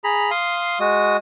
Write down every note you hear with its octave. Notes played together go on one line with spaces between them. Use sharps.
G#4 A#5 B5
F5 C6 D#6
G#3 F#4 D#6